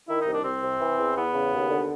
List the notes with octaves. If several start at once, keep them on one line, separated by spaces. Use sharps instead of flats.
D#3 E4
D#4
C2
D4
C2 C4
C3
E3
E2
E2 B3
C#3
D#2
D3